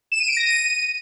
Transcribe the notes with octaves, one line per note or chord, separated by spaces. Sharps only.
E7
D#7
D7
A#6
D#7